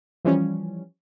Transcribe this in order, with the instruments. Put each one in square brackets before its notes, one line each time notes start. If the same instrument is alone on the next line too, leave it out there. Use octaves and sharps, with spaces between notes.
[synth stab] E3 F3 G3 C#4